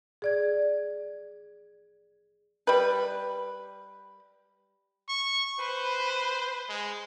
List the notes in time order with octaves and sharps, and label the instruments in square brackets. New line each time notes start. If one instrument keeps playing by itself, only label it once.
[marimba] G#4 D5 G#6
[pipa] G3 B4
[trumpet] C#6
[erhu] B4 [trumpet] C5
[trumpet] G#3